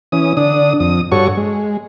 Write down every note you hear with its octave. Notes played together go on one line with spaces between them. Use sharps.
E3 C#4 D#6
D3 D4 D#6
F2 D#6
G2 F#4 A4 C#5 C#6
G#3